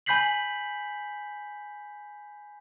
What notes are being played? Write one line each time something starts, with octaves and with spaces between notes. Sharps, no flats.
G#5 B5 G6 B6 C7 F#7